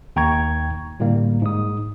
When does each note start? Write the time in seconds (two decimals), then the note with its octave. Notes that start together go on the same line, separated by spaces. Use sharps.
0.16 D#2 G5 A#5 C#6 G#6
1.00 A2 D3 G3 A#3
1.42 G#2 D#6